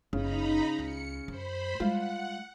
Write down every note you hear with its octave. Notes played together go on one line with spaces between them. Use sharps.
F#1 C#3 D#4 A#5 B5
C#2 C#7
F#2 C5 B5
G3 G#3 F4 F#5